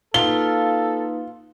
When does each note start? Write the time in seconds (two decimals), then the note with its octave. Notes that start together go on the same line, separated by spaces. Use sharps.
0.14 A#3 D#4 F4 A4 B4 G7